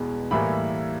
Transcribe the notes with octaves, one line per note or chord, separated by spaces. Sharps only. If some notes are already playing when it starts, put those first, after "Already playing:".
Already playing: E2 B2 G#3 B3
A2 E3 G3 A#3 B5